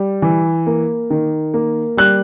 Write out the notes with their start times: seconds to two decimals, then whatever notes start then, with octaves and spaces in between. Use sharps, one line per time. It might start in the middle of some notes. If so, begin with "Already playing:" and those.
Already playing: G3
0.22 E3
0.67 A#3
1.10 D#3
1.54 A#3
1.97 G3 F#6